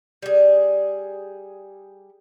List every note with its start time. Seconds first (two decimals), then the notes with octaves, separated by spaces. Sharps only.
0.22 G3 G#4